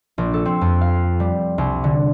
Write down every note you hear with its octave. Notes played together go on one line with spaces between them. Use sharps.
A#1
A4
C4
F2
F5
G3
C2
D3